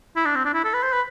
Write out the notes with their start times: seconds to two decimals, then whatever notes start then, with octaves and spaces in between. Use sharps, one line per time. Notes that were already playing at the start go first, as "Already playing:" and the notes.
0.16 E4
0.26 D4
0.35 C4
0.45 D4
0.54 E4
0.64 A4
0.74 B4
0.83 C5
0.93 B4